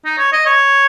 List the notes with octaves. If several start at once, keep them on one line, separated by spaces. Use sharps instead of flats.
D#4
C#5
D#5
C#5